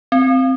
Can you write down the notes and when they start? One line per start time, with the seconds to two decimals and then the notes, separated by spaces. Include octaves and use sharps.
0.12 C4